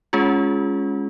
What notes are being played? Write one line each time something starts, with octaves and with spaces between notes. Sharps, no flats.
G#3 C#4 F4 G#4